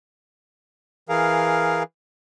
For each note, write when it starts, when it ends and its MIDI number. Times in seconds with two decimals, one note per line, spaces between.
1.09 1.83 52
1.09 1.83 68
1.09 1.83 70
1.09 1.83 77